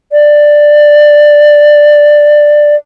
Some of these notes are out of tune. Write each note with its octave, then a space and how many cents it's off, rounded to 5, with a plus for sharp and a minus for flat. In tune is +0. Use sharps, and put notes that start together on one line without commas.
D5 +10